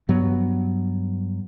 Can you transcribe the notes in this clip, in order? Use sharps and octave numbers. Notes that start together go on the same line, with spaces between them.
G2 F#3 B3